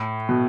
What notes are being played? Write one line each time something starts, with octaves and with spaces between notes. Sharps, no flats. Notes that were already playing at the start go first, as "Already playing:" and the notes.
Already playing: A2
B2